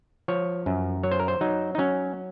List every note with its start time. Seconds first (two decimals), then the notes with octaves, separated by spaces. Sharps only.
0.28 F3 C#5
0.66 F#2
1.03 F#3 C#5
1.11 C5
1.19 A#4
1.28 C5
1.41 F#3 D#4
1.75 D#4
1.78 F#3 C#4